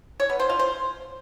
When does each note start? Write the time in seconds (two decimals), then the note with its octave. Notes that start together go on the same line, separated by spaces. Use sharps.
0.20 C#5
0.30 B3
0.40 C5
0.49 F4
0.59 C5